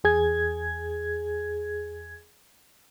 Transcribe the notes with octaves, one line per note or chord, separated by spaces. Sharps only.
E2 G#4 G#6